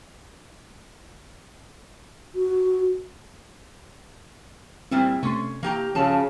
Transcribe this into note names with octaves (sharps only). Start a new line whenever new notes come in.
F#4
A#2 G3 C4 E4
C3 A3 C#4 C6
E3 A#3 G4 A#5
G2 C#3 E3 F3 F#4 A5